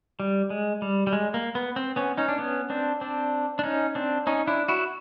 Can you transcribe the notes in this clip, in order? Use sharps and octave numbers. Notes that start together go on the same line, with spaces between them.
G3
G#3
G3
G3
G#3
A#3
B3
C4
B3 C#4
C#4 D#4
D4
B3 C#4
C4 D4
C4 D4
D4
C#4 D#4
C4 D4
C#4 D#4
D4 E4
E4 F#4